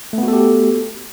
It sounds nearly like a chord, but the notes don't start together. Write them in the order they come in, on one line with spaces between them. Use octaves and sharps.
A3 B3 F#4 A4 G4